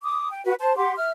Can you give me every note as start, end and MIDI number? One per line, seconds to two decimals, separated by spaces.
0.03 0.29 86
0.03 0.29 87
0.29 0.44 79
0.46 0.54 66
0.46 0.54 71
0.59 0.75 72
0.59 0.75 81
0.76 0.93 67
0.76 0.93 78
0.76 0.93 84
0.76 0.93 86
0.96 1.11 76
0.96 1.11 89